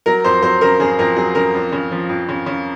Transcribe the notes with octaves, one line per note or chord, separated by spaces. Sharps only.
F#3 A#4
F2 C5
F#3 C5
C#3 A#4
C#3 G#4
F2 A#4
F#3 G#4
C#3 A#4
F2
C#3
F3
F2
C#3
C#3